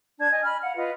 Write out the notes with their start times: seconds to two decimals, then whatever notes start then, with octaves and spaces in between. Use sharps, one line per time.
0.19 D4 A5 G#6
0.31 D#5 G#5
0.44 B5 F6
0.62 F5 F#5
0.76 F4 B4 D#5